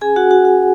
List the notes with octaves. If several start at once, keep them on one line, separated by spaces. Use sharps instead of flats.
C#4 G#4 G#5
F#4 F#5
F#4 F#5
F#4 F#5